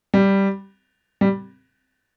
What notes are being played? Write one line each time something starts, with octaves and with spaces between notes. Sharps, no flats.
G3
G3